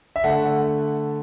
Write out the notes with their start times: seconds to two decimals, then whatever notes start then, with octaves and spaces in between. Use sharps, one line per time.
0.16 E5
0.24 D3 A3 F#5